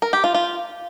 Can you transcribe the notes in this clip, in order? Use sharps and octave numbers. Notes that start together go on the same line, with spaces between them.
A#4
G4
F4
F4